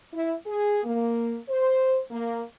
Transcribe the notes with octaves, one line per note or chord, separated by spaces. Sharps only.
E4
G#4
A#3
C5
A#3